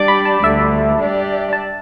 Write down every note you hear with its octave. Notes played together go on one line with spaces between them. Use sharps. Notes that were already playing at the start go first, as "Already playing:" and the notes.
Already playing: G3 D4 G4 D5 D6
B5
A5
D2 D3 G3 E5
G3 D4 G4 D5
A5